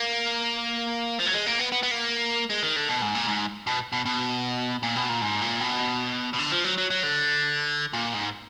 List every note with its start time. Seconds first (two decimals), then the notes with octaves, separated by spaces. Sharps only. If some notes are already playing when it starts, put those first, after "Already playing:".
Already playing: A#3
1.19 F3
1.26 F#3
1.34 G#3
1.46 A#3
1.59 B3
1.72 B3
1.83 B3
1.91 A#3
2.50 G#3
2.63 D#3
2.76 D3
2.89 B2
3.02 G#2
3.15 A#2
3.27 G#2
3.67 B2
3.92 B2
4.06 B2
4.83 A#2
4.96 B2
5.09 A#2
5.22 G#2
5.42 A#2
5.61 B2
6.33 B2
6.39 D3
6.52 F3
6.64 F#3
6.78 F#3
6.90 F#3
7.03 D3
7.94 A#2
8.14 G#2